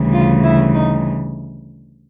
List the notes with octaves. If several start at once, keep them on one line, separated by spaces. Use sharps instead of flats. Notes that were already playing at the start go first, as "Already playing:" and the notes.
Already playing: D2 C#3 E3 G3
F4
E4
D#4